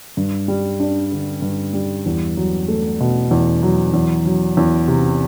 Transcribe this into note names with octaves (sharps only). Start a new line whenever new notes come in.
G2
G3
D4
D3
G2
G3
E2
F#3
A3
B2
E2
F#3
E2
F#3
E2
C3